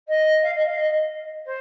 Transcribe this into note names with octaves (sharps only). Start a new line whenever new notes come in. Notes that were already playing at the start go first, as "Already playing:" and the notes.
D#5
F5
D#5
F5
D#5
C5